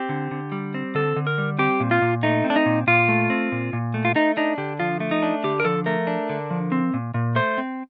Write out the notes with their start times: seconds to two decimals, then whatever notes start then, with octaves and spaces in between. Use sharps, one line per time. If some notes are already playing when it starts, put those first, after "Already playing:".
Already playing: C4 G4
0.09 D3
0.31 D3
0.52 G3
0.74 C4
0.95 D3 A4
1.16 D3
1.27 A#4
1.38 G3
1.59 C4 G4
1.80 A#2
1.91 F4
2.02 A#2
2.23 A3 D#4
2.44 C4
2.50 D4
2.56 D#4
2.66 A#2
2.87 A#2 F4
3.09 A3
3.30 C4
3.52 A#2
3.73 A#2
3.94 A3
4.05 F4
4.15 A3 D#4
4.37 D4 D#4
4.58 D3 G4
4.80 F3 F4
5.00 A3
5.11 D#4
5.22 D4
5.44 D3 G4
5.60 A#4
5.65 F3 A4
5.86 A3 A#4
6.07 D4
6.30 D3
6.51 F3
6.72 C4
6.94 A#2
7.14 A#2
7.35 A3 C5
7.58 C4